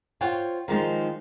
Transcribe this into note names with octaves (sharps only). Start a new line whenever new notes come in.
F4 C5 C#5 F#5 G5
D#3 F3 G#3 D#4